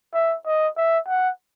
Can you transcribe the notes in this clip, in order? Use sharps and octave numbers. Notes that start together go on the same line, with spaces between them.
E5
D#5
E5
F#5